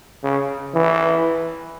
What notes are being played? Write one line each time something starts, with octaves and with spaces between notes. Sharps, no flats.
C#3
E3